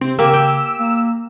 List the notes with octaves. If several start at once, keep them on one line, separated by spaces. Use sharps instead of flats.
C3 C4
C#3 A#3 G4 G#5 E6
G5
A#3